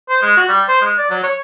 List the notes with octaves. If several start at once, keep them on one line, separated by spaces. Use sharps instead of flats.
C5
G#3
F#4
G3
C5
G#3
D5
F#3
C#5